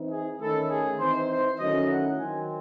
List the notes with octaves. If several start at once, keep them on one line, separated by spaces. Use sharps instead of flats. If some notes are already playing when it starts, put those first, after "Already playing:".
Already playing: E3 C4 D#4
G#4
D#3 A3 C#4 E4 A4
G#4
E3 C4 D#4 C5
C5
D#3 F#3 A3 C#4 E4 D#5
F#5
D#3 F#3 C4 G#5